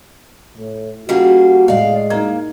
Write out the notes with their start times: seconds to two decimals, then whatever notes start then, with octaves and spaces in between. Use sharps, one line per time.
0.58 A2
1.09 G3 A#3 C#4 F4 F#4 G#4
1.68 A2 G#3 E4 D5 F5
2.10 A#3 D#4 G#6